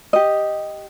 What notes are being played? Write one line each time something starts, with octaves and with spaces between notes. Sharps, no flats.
G4 D#5